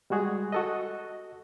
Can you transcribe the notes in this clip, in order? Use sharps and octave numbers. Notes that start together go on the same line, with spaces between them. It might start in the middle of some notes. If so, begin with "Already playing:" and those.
G3 G#3 F#4 G#4
F#4 A4 D#5